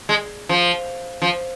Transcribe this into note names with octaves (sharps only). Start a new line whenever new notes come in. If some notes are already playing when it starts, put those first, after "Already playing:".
G#3
F3
F3